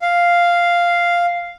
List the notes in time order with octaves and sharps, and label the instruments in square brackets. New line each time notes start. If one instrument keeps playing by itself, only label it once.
[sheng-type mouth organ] F5